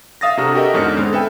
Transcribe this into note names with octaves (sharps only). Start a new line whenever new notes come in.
E5 F5 D#6 A6 A#6
C3 D4 F#4 A4 A#5 F6
F#4 G4 A4 A#4 D#5 E5
E2 G#2 D3 C#4 F6 C#7
D3 G#3 B3 C4
A4 B4 E5 G5 G#5